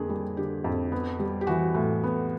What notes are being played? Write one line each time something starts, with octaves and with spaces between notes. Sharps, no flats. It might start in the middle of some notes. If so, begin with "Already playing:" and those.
Already playing: F2 D3 A#3 G#4
G3
D3 G4
F2
B3
G3
G4
E3 F#4
A2
B3